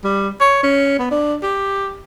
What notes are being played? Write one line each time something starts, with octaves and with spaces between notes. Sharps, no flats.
G3
C#5
C#4
B3
D4
G4